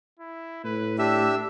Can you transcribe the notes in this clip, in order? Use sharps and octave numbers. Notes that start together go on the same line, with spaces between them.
E4
A2 B4
D4 G4 E5 E6